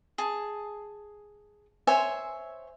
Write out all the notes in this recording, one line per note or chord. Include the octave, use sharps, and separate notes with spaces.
G#4 A5
C5 C#5 E5 G#5